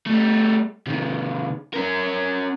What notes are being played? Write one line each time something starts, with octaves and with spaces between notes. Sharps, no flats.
G3 A3
C3 D#3
C#4 A#4